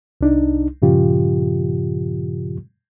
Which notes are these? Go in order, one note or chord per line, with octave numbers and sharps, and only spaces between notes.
C2 D4 D#4
G2 A#2 C#3 F3 F4 G4